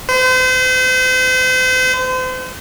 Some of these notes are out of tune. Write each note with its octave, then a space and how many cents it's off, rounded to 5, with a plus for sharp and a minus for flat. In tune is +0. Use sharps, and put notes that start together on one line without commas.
C5 -40